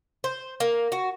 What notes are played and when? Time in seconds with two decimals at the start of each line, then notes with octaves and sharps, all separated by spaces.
0.24 C5
0.60 A#3
0.92 F#4